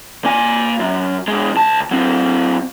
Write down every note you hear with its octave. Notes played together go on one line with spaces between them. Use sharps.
A#3 G#5
F#2
B2 G#3
C#2 A5
F#3 C4